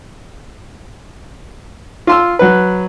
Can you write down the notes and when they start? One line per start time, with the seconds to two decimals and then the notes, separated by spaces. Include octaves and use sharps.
2.07 F4 C6 E6
2.39 F#3 B4